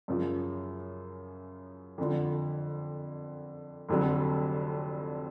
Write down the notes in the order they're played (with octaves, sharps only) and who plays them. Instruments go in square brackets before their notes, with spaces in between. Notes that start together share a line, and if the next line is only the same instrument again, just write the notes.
[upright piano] F#2 C#3 F3
F2 D3 F3
F1 F2 D3 F#3